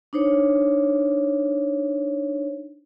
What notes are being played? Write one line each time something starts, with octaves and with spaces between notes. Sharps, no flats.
D4 D#4 C5 C#5